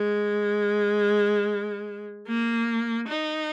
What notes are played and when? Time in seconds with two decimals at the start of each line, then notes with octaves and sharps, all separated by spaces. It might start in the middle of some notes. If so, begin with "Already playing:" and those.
Already playing: G#3
2.27 A#3
3.08 D#4